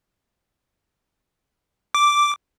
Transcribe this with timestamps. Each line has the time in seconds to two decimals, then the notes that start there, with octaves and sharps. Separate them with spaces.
1.95 D6